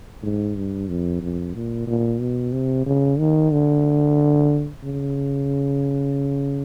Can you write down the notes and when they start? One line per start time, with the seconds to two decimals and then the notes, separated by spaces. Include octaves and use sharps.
0.23 G#2
0.56 G2
0.89 F2
1.22 F2
1.54 A#2
1.87 A#2
2.20 B2
2.53 C3
2.86 C#3
3.19 D#3
3.52 D3
4.84 C#3